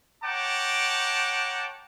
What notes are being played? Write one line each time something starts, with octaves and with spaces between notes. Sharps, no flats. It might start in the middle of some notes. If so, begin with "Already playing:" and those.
C#5 F#5 G5 A5 A#5 D6